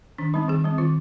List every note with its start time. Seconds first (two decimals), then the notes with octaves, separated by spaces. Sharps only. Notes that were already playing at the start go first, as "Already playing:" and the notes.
0.18 D#3 D4
0.34 G3 C4 D#4
0.48 D#3 G#4
0.64 G3 C4
0.78 D#3 F4